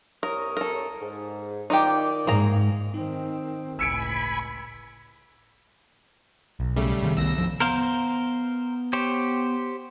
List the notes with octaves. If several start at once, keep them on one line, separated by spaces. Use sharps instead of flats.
C2 A#4 C#5 D#6
A4 A#4
G#2
D#3 D#4 F4 G4 D5
G#2 A#3 G#4 A#5
D#3 C4 D#4
G1 C#2 A2 G#5 B5 E6 C#7 D7
B1
C#3 G3 A3
C3 D#3 B3
C2 E6 A#6
G2 F3
B3 A#4 C5 F5
G4 C5 C#5